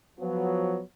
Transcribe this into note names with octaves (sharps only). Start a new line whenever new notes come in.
F3 F#3 B3